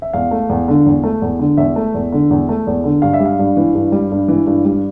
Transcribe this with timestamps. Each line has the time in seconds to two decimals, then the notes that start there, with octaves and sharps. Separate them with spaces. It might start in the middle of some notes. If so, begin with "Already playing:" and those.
0.02 E5
0.13 E2 F5
0.31 A3
0.49 E2
0.68 D3
0.86 E2
1.04 A3
1.22 E2
1.39 D3
1.57 E2 E5
1.76 A3
1.94 E2
2.12 D3
2.31 E2
2.49 A3
2.67 E2
2.84 D3
3.02 G2 F5
3.14 E5
3.20 G3
3.25 F5
3.39 G2
3.57 E3
3.75 G2
3.92 G3
4.11 G2
4.28 E3
4.46 G2
4.65 G3